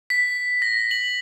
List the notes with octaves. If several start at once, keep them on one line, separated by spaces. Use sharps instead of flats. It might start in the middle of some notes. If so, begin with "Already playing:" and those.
B6
A#6
F#7